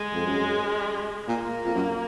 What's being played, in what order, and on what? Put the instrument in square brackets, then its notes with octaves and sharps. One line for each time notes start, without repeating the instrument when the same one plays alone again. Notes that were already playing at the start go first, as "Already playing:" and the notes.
Already playing: [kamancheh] G#3
[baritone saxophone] F2
F#2
[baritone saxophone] A#2 [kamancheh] A#3
[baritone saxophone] F2
F#2